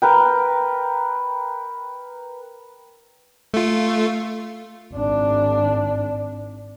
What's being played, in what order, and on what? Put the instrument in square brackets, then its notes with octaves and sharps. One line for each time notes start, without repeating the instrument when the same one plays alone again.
[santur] A#4 B4 G5
[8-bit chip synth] A3 F4
[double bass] G#1 D4